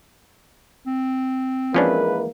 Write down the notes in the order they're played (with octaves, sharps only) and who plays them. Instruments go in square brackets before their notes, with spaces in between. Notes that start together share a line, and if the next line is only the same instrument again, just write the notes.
[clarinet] C4
[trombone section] E3 G#3 A#3 [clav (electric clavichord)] F3 C#4 D4 [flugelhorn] B4